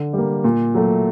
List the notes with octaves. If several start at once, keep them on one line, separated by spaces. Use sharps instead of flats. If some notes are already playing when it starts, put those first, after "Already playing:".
Already playing: D3
G3 A#3
A#2
F#3 A3